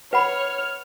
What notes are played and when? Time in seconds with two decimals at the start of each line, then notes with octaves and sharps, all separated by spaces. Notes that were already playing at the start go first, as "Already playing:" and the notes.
0.13 B4 C#5 F#5 B5 F6